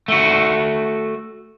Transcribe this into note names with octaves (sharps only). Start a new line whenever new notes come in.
A3 F#4